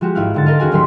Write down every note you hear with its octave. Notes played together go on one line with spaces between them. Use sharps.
F3 G#3 F#4 G4
G#1 E4 F5 F#6
G#2 D3 A6
A4 A#4 C5 D#5 F5 A5
D#2 C#4 F#4 G#4 G#5 F6
D#1 A1 D#2 F#3 C6 B6